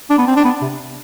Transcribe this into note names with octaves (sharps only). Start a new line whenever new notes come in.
D4
B3
C4
D4
B3
C3